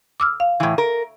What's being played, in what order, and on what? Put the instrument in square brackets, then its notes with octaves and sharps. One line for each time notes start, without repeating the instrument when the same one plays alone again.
[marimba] D6 E6 F6
F5
[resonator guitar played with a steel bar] A2 E3
A#4